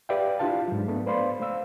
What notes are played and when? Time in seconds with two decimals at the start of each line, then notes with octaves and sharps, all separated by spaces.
0.09 G4 B4 D5 E5 F5 G5
0.39 D4 E4 F4 G4 F5 A5
0.68 G#2 F#3
0.88 A3 B3 D4
1.06 B4 C5 D5 F5 B5 C6
1.40 A3 C5 F5 E6